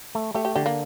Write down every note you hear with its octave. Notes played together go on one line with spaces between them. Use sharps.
A3
A3 G4
G4
D3 G4
A#3